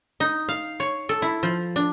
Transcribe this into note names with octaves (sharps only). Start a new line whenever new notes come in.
D#4
F5
C#5
A4
E4
F3
D4